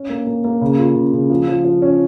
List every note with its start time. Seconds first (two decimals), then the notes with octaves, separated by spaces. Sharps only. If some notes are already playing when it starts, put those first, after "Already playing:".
Already playing: C#4
0.09 A#3
0.27 A#3
0.44 A#3
0.61 C#3
0.79 F4
0.96 C#3
1.13 C#3
1.30 F3
1.48 F3
1.64 F3
1.82 C#4